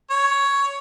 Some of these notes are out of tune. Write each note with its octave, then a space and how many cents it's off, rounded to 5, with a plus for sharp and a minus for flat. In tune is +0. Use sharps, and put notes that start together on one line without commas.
C#5 +10